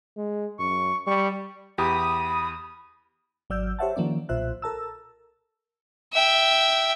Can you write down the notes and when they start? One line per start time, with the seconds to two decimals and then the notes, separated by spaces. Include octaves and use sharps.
0.17 G#3
0.59 F#2 C#6
1.07 G3 C#6
1.78 E2 G4 B5 D#6
3.50 G#1 F#3 D5 E6 F6 G6
3.79 G4 C5 C#5 E5 F#5 A5
3.96 D#3 F3 A#3 C#4 D5
4.29 B1 A#2 F4 C5 E5 F#6
4.62 A4 A#4 A5 E6
6.13 E5 G5